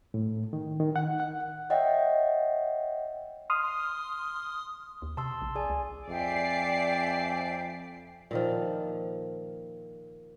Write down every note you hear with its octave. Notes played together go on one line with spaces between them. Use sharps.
A2
D#3
D#3
F#5
F#5
C#5 D#5 E5 F#5 G5
C6 D#6 F6
D#2
C3 A5 C6 E6
A#1
G#4 D5 G#5
C#2
F2 D5 E5 G5 G#5 C7
A#2 D#3 F3